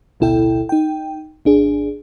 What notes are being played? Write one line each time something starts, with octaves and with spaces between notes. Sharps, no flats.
A1 D2 B2 E4 A4 G5
D#4 G5
G#1 D4 G#4